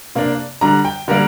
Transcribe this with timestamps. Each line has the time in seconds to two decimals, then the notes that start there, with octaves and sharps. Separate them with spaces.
0.15 C3 A#3 D4
0.61 D3 G3 D4 A#5
0.85 G5
1.08 D3 G3 A#3 A#4